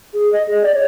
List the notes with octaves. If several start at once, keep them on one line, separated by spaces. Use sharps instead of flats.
G#4
D#5
G#4
D5
C#5